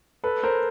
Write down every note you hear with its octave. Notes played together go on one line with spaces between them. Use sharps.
A4 B4
A#4 C5